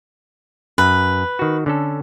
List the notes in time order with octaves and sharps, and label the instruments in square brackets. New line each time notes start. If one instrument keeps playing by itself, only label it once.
[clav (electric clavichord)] F#2 [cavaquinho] B4
[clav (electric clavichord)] D#3 F#4
D3 C#4 A4